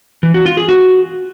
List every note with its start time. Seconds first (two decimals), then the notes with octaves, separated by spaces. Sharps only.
0.23 E3
0.34 F#4
0.46 F4
0.57 G#4
0.69 F#4